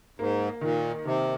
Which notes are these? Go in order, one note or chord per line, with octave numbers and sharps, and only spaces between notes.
G#2 A#3
A#2 D#3
C3 D#3